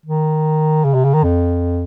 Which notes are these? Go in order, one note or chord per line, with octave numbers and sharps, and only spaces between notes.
D#3
C#3
C3
C#3
D#3
F2